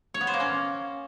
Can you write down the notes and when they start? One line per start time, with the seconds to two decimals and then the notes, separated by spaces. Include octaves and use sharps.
0.14 C#5
0.21 B3
0.27 C5
0.34 A#3
0.40 C#4